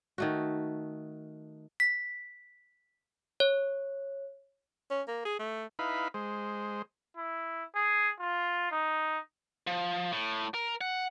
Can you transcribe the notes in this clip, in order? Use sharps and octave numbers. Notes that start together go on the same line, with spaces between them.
D#3 A3 F#4
B6
C#5
C#4
A#3
G#4
A3
D#4 E4 B4 F5 B5
G#3 C5
E4
G#4
F4
D#4
F3
A2
A#4
F#5